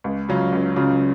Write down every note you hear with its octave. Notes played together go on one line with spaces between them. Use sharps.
C#2
C#3 F#3 C#4 F4
C#2
C#3 F#3 C#4 F4